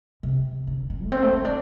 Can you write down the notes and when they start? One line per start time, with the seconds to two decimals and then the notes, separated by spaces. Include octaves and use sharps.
0.23 C3
0.67 D3
0.90 D3
1.04 A3
1.12 C4
1.23 A3
1.33 C4
1.45 D4